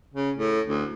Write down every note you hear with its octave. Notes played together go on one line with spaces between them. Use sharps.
C#3
A2
D2